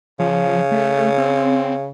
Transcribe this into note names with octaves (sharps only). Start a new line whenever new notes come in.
C#3 F3
A3
C4